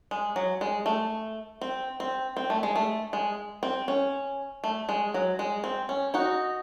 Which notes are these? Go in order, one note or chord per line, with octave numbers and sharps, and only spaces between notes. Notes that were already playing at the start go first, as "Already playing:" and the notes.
G#3
F#3
G#3
A3
C4
C4
C4
A3
G#3
A3
G#3
C4
C#4
A3
G#3
F#3
G#3
C4
C#4
D#4 F#4